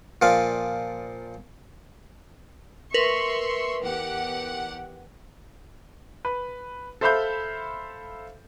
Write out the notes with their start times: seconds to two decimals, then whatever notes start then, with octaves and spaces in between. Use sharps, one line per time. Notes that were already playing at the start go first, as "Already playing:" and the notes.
0.22 A#2 F3 D5 F5
2.94 A#4 B4 E5 C6 C#6
3.83 E2 G4 F#5
6.25 B4
7.01 A4 C5 E5 F5 B5 G6